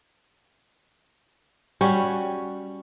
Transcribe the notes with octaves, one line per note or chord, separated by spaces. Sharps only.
G3 C#4 F#4 C#5